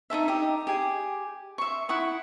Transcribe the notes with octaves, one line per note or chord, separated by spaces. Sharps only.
D#4 E4 A4 E5
D#4 G4
G4 G#4 G#5
E5 C6 C#6
E4 F#5 C#6 D#6